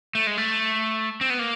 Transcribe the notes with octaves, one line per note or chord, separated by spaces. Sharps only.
A3
G#3
A3
C4
B3
A#3